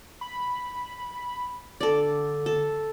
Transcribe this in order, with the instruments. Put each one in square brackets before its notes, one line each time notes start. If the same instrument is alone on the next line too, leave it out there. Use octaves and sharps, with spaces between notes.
[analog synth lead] B5
[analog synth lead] D3 [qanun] A4 D5
[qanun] A4